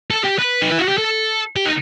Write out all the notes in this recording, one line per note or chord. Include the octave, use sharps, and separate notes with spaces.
A4
G4
B4
D#4
E4
F#4
G4
A4
G4
D#4